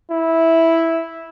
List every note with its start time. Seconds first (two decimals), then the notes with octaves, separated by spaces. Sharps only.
0.10 E4